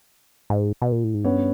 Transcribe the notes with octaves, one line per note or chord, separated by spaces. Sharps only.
G#2
B2
A#2
A2
G#2
G2 B3 C#4